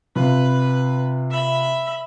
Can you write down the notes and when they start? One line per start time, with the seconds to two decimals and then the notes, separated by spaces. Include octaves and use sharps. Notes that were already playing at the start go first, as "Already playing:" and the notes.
0.16 C3 F4 B4
1.31 E5 B5